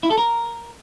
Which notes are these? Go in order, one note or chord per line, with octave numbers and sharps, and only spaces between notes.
E4
A4
A#4